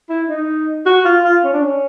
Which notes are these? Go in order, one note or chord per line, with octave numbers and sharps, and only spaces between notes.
E4
D#4
F#4
F4
F4
C#4
D4
C#4